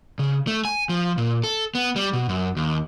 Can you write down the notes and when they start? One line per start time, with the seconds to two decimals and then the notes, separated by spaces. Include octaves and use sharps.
0.19 C#3
0.47 A3
0.65 G#5
0.89 F3
1.18 A#2
1.44 A4
1.75 B3
1.96 G3
2.13 B2
2.29 F#2
2.57 D#2